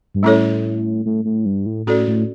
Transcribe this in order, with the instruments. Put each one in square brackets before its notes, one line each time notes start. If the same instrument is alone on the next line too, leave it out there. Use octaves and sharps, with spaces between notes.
[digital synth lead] G2
[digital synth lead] A2 [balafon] G3 C#4 E4 A4 C#5
[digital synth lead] A2
A2
G2
A2
[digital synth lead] A2 [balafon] C#4 F#4 A4 D5
[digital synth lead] A2